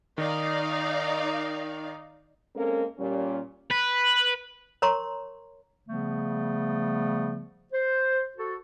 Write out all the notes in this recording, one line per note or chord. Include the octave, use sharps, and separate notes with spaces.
D#3 D#4 D5 F5
G#3 A#3 C4 C#4 A4 A#4
A#2 G3 C#4
B4
A#4 C#5 A#5 C6 C#6
C#3 F3 G3 A3 B3
C5
F#4 A4